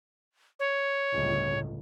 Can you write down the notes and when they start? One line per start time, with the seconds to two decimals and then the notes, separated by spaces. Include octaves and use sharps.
0.60 C#5
1.15 G1 C#2 A2